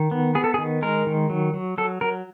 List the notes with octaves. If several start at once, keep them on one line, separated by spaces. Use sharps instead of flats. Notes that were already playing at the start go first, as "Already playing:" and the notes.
Already playing: D#3
B3
B3 G#4
A4
G#4
D#3
G#3 A#4
D#3
F#3
F#3
F#3 A4
F#3 A#4